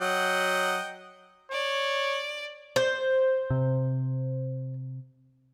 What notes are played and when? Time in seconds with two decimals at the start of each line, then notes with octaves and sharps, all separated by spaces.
0.01 F#3 D#5 F#5 G5
1.52 C#5 D5
2.76 C5
3.50 C3